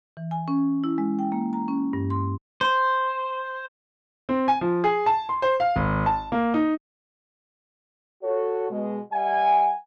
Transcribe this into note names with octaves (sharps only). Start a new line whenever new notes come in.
E3
G#5
C#4
E4
G#3
G5
A#3
A#5
C#4
G2
C6
C5
C4
G#5
F3
G#4
A5
C6
C5
F5
G#1
A5
A#3
D#4
F#4 A4 C#5
B2 G#3
G3 E5 F#5 G#5